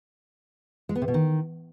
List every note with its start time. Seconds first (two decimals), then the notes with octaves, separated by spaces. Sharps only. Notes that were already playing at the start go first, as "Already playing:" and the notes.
0.89 G#3
0.95 B3
1.02 C3
1.08 B2
1.14 D#3